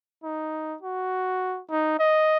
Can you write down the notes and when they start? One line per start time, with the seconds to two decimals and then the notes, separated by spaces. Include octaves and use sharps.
0.24 D#4
0.82 F#4
1.70 D#4
1.99 D#5